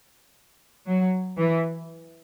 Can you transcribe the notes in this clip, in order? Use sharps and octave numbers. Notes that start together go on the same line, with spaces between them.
F#3
E3